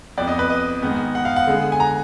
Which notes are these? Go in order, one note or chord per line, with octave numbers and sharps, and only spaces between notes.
F2 F3 B3 D5
D#5
B4
D#5
G#2 D#3 G#3 B3
F#5
F5
F#5
D3 G#3 B3
G#5
A#5